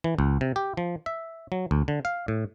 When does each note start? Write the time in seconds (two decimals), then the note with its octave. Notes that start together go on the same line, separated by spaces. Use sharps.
0.04 E3
0.19 C#2
0.41 C3
0.56 G4
0.77 F3
1.06 E5
1.52 F#3
1.71 D2
1.88 D3
2.05 F5
2.28 A2